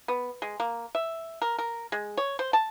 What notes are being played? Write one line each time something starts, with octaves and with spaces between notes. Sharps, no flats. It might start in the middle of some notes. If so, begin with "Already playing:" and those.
B3
G#3
A#3
E5
A#4
A#4
G#3
C#5
C5
A5